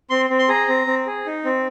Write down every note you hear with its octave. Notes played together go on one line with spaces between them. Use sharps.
C4 C6
C4
C6
G#4 A#5
C4
C4
G#4
D#4
C4